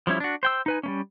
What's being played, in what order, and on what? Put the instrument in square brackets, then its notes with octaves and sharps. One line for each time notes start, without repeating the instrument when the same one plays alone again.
[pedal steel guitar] F3 G3 C#4 E4
D4 F#4
C5 G5 E6
D#4 B4 G#5
G3 A#3 C#4